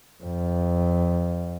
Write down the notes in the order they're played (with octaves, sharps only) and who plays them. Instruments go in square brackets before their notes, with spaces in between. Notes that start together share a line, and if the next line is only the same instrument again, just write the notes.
[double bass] F2